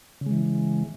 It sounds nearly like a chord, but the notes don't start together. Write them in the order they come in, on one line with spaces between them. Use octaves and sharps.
C#3 G#3 E3